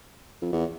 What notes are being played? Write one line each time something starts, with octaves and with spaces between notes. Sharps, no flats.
F2
E2